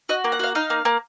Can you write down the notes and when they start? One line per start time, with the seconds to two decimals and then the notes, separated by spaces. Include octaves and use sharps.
0.09 F#4 D#5
0.24 A#3
0.32 F#5
0.39 F#4 F5
0.55 D#4 F5
0.70 A#3
0.85 A#3